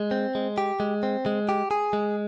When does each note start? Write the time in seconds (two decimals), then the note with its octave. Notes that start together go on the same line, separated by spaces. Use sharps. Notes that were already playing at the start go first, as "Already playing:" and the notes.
Already playing: G#3
0.11 C4
0.35 G#3
0.58 G4
0.80 G#3
1.03 C4
1.26 G#3
1.49 G4
1.71 G#4
1.93 G#3